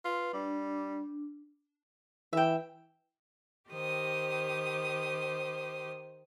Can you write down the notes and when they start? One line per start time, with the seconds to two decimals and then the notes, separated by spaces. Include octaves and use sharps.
0.04 F4 B4
0.33 G3 D4
2.33 E3 E5 G5
3.69 D#3 G4 C5 D#6